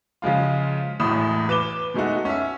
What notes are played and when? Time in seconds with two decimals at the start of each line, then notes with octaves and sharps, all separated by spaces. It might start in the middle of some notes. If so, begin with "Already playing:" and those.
0.22 C#3 F3 G#3 F4
1.00 E1 E2 A2 D#6 E7
1.49 B4 D6 E7 G7
1.94 B2 G#3 A3 D#4 F#4
2.25 C#4 E5